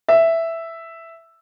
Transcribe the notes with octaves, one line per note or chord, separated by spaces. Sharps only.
E5